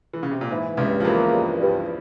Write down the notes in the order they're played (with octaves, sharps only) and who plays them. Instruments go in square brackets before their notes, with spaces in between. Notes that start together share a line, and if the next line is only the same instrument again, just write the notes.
[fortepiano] E3
C#3
C3
A#2
[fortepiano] G#2 [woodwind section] E3
[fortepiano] C#2 C#3 [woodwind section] G2
[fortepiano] F3
[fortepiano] E2 E3 [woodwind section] A#3
[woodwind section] G2
G2